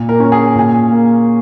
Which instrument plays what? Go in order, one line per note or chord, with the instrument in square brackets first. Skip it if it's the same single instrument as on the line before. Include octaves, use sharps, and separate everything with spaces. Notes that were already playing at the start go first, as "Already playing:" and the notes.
Already playing: [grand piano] A#2
A#4
C#4
G#4
A#2 G#4
A#3